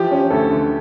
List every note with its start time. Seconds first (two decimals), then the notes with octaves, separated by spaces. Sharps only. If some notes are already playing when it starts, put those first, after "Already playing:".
Already playing: E3 F3 G4
0.11 C#4
0.30 D2 A4
0.50 D3